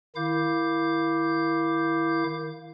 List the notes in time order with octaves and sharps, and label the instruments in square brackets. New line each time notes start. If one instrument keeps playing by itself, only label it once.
[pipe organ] D#3 E4 F5 D6 G6